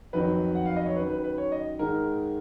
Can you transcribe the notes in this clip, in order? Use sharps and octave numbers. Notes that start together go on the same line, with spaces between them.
F2 D#3 F#3 B4
F#5
F5
D#5
C#5
F#2 D#3 F#3 B4
B4
B4
C#5
D#5
G#2 D#3 G#3 A#4